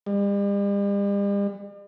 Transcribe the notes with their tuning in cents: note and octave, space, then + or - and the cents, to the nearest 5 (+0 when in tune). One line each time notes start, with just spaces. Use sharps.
G3 +45